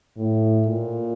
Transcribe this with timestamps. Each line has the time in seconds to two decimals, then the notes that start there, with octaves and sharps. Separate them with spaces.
0.17 A2
0.66 A#2